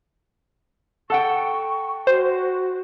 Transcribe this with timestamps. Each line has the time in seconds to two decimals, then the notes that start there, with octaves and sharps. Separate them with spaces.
1.10 A4 F#5 G5 C#6
2.07 F#4 C5